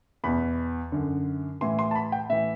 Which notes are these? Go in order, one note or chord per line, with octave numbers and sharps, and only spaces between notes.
E2 B2 B5
F#2 D3
A2 E3 C6
C6
A5
B5
G5
A2 E3 E5